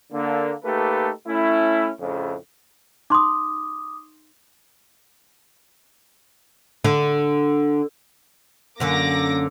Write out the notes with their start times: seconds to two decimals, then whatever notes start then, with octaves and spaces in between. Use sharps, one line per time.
0.12 D3 A#3
0.64 A3 A#3 D#4 G4 A4 B4
1.27 A3 C#4 E4
1.99 F2 A2 C#3
3.10 D#4 C6 D6 D#6
6.84 D3
8.80 F#2 D3 A#3 C#4 D6 A#6